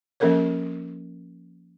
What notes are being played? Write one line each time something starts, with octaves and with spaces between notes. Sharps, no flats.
F3 A#3 C#4 A4 A#4 C#5